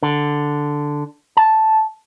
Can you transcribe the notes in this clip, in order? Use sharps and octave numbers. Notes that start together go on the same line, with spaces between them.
D3
A5